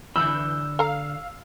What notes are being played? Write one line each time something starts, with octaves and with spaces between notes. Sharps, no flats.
D3 E3 B5 E6 G6
A4 F5 A#5